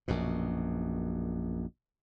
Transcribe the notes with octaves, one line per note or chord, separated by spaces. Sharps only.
A#1 F#2 B2